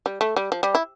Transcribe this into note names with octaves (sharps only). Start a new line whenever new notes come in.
G3
A3
G3
F3
G3
E4